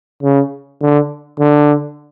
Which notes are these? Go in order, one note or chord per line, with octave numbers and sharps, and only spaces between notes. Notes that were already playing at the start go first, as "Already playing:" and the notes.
C#3
D3
D3